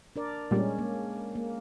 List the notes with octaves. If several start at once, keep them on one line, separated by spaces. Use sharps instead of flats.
D4 A#4 D5
A#2 G3 G#3 C#4
A#3
A#3